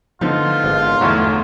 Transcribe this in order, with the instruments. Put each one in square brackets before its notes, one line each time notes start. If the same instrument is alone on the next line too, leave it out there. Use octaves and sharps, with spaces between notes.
[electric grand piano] D3 F3 [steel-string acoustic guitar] B3 D#4 [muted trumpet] F4
[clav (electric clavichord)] G#1
[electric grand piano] G1 E2 A3 [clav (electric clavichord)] F#3 E4 C#5